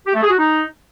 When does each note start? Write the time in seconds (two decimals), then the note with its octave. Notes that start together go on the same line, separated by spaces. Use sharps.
0.05 G4
0.14 A3
0.22 G#4
0.30 F#4
0.38 D#4